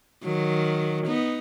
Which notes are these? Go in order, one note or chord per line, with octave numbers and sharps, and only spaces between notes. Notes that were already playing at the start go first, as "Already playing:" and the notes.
D#3 F#3
B3 D#4